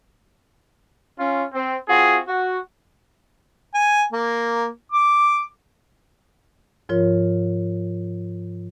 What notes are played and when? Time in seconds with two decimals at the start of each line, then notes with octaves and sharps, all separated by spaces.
1.18 C#4 F4
1.54 C4
1.89 C4 F4 F#4 G#4
2.28 F#4
3.74 G#5
4.13 A#3
4.92 D6
6.89 G#2 F3 F4 A#4 C#5